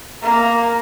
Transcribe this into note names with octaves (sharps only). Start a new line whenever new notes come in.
A#3 A#5